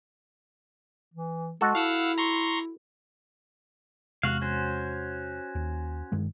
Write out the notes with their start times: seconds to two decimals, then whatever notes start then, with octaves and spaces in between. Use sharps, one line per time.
1.14 E3
1.61 G#3 F#4 A4
1.75 E4 F5 F#5 E6
2.18 A#5 C6 C#6
4.23 E2 C3 G#3 F#4 F5
4.42 C#4 F#4 C5
5.55 D#2
6.12 G2 D#3 G#3